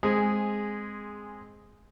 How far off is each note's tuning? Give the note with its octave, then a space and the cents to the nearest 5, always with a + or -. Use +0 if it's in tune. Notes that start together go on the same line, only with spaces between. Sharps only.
G#3 +0 C4 +0 G#4 -10